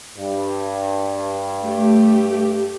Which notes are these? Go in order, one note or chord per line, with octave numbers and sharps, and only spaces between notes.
G2
A3 G4